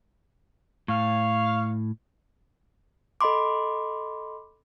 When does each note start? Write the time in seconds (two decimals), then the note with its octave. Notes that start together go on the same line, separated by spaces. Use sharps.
0.88 A2 C#5 F5
3.21 A4 D#5 B5 C6 D6